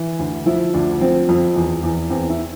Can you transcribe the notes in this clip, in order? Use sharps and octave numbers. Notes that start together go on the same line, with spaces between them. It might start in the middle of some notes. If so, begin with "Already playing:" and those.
Already playing: E3
D2
F3 E4
D2 D4
F3 C4
F2
E2
E2
E2 C4
E4